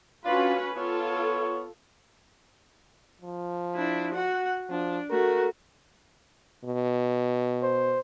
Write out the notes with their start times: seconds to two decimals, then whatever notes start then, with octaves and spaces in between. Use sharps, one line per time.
0.25 C#4 D4 F4 F#4 B4
0.75 B3 F4 A4 C#5
3.22 F3
3.75 D4 E4
4.14 F#4 F#5
4.70 F3 D4
5.10 A3 F#4 A#4
6.64 B2
7.63 C5